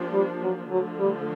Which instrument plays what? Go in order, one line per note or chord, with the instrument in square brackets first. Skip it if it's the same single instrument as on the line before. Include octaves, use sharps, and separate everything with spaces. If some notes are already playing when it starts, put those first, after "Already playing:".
Already playing: [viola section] F3 A#3 D4 G4
[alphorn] G3
F#3
[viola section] D3 F3 A3 [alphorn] F#3
[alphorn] G3